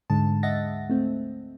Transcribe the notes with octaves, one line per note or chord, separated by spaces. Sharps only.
D2 G#2 D3 G#3 A5
D#5 E5 F#5 A6 A#6
A3 C4